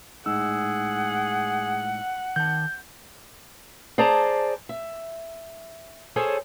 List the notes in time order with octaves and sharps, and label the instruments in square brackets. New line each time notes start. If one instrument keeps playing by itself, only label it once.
[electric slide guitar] A2 G#3 D#4 [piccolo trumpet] G#4 [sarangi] F#5 [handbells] E6
[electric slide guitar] D#3 A5 [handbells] G6
[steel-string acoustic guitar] G#4 C5 D5 A5 A#5
E5
G#4 A4 C5 C#5 G#5